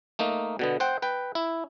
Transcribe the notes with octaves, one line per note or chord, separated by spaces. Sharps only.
A3 A#3 D#4
B2 D3 B3
C5 F#5 G5
B4 G5
E4